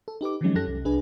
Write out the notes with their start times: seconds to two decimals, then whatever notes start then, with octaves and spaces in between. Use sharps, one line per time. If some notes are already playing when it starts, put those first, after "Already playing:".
0.08 A4
0.21 D#4 G4 B4 D6
0.41 D#3 F3 F#3 G#3 C#4 D#4
0.55 F#2 C#4 G4 A4 F#6 A#6
0.67 C2
0.85 C2 D4 G#4 B4 G#5